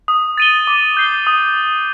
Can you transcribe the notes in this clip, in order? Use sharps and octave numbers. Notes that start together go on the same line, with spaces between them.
D#6
A6 D#7 G7
D6
G6 C7 G7
D#6